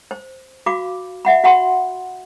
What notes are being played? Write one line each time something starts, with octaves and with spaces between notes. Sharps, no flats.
C5
F#4 F5 B5 D6
E5 F#5 B5
F#4 F#5 B5 C6